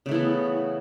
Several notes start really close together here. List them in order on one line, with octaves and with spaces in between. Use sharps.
C#3 A3 E3 B3